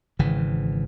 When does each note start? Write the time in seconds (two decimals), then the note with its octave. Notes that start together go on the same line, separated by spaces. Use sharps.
0.19 G#1 C#3 E3